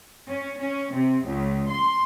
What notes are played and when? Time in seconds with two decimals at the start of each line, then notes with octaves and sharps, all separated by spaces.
0.27 C#4
0.59 C#4
0.93 C3
1.24 C#2
1.69 C6